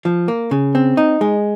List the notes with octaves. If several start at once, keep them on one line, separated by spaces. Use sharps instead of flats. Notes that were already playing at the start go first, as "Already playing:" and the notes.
F3
A#3
C#3
C4
D#4
G#3